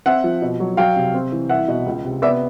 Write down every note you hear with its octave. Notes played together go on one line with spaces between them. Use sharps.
C4 E5 F#5
F3
B2
F#3
F#3 F5 G5
C3
C4
E3
C2 E5 F#5
B2
C#2
C3
B3 D5 E5